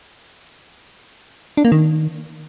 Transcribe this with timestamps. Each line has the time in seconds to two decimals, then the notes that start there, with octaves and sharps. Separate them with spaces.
1.57 D4
1.65 A#3
1.72 D#3